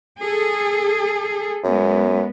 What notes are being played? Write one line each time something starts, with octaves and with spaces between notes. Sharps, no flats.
G#4 A4
F#2 G#3 B3